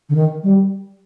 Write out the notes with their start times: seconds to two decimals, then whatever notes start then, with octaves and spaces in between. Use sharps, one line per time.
0.09 D3
0.15 D#3
0.43 G3